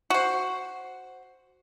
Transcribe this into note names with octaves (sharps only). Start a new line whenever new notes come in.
F#4 C5